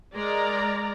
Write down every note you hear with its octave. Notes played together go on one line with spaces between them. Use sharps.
G#3 A#4 D5 A#5